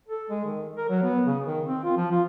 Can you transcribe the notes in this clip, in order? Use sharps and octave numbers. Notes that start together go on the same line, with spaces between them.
A4
G#3
D#3
A#4
F#3
B3
C#3
D#3
C4
F4
F3
F4